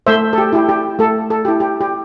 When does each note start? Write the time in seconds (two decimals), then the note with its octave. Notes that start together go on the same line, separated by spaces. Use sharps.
0.07 A3 C5 E5
0.33 A4
0.38 G4
0.53 E4 G4
0.69 G4
0.99 A3 A4
1.30 A4
1.45 E4 G4
1.60 G4
1.81 G4